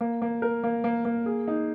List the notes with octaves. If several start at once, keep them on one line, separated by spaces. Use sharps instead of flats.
A#3
A#3
A#4
A#3
A#3
A#3
G#4
D#4